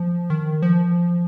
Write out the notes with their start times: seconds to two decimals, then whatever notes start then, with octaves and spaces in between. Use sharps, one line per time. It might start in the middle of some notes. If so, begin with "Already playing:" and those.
Already playing: F3
0.30 D#3
0.62 F3